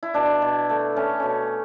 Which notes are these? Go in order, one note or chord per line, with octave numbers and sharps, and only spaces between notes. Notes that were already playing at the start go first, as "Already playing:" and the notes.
E4
B2 D4
B2
A3
A3 C#4
B2 C#4